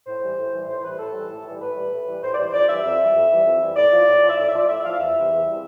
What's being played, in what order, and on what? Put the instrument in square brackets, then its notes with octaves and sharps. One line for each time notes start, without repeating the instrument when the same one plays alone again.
[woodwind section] A2 C5
E3 G3
A2
E3 G3
A2 C5
E3 G3 B4
A2 A4
E3 G3
A2
E3 G3
A2 B4
E3 G3
A2
E3 G3
A2 C5
D5
E3 G3 C5
F2 D5
E3 G3 E5
F2 E5
E3 G3
F2
E3 G3
F2
E3 G3
A2 D5
F3
A2
F3
E5
A2 D5
E5
F3 D5
A2 E5
F3 F5
E2 E5
C3 E3 G3
E2
C3 E3 G3